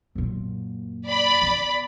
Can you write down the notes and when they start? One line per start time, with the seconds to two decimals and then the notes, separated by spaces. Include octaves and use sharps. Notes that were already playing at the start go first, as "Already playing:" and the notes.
0.15 F#2 A#2
1.07 D5 B5
1.42 C#3 B3